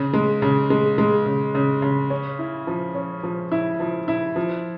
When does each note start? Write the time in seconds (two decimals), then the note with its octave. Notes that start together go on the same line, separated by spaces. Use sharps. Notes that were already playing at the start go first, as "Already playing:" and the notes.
Already playing: C#3
0.14 G#3
0.42 C#3
0.70 G#3
0.98 G#3
1.26 C#3
1.55 C#3
1.82 C#3
2.10 C#4
2.39 E4
2.67 F3
2.95 C#4
3.23 F3
3.52 E4
3.80 F3
4.08 E4
4.36 F3